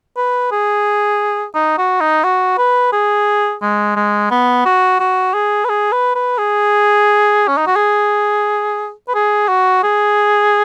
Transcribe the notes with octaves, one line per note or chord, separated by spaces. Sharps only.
B4
G#4
D#4
F#4
D#4
F#4
B4
G#4
G#3
G#3
B3
F#4
F#4
G#4
B4
G#4
B4
B4
G#4
C#4
D#4
F#4
G#4
B4
G#4
F#4
G#4